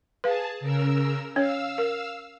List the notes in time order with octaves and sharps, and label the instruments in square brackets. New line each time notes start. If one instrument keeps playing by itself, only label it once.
[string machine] G#4 A5 [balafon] B4 F5
[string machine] C#3 A#4 E6
[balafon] C#4 C#5 [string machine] F5 E6
[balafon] A#4